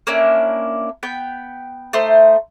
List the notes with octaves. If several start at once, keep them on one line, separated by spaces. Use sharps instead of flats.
A#3 C#4 D4 E4
B3 G5 B5 G6
A3 D#4 C5